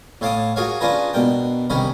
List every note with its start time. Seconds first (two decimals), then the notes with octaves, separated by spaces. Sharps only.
0.21 A2 C#5 F5 A5 D6 D#6
0.56 F4 F#4 G#4 A#4 C#5 F5
0.80 C#4 D4 F4 G#4 B4 A#5
1.13 B2 D4 A#4 G5
1.70 C2 D#3 C#4 A#4 B5